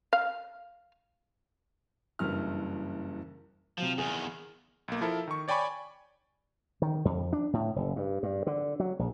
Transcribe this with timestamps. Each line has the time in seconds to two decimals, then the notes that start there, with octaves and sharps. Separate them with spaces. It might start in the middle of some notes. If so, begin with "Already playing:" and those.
0.13 F5
2.19 F#1 G2 E3 F6
3.78 C3 F3 F#3
3.98 E2 D#3 G#4
4.88 B1 A#3
5.01 F3 E4 A4 A#4
5.27 D#3 C#6
5.48 C#5 D5 G5 G#5 B5 C#6
6.82 D#3
7.05 F2
7.33 D4
7.53 A2
7.76 F#1
7.96 G2
8.23 G2
8.47 D3
8.80 F#3
8.99 A#1